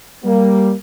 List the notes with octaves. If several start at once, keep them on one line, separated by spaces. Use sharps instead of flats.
G3 A#3